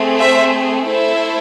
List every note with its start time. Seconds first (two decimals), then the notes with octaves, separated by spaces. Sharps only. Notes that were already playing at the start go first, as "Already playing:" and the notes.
Already playing: A3 C4 G#4
0.18 C5 E5
0.86 A3 E4 A4 C5 E5